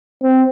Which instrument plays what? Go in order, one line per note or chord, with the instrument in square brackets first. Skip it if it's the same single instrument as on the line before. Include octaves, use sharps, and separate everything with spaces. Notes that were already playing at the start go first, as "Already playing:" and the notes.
[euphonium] C4